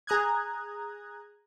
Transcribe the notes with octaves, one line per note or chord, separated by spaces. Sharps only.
G#4 A#5 D#6 F#6 G#6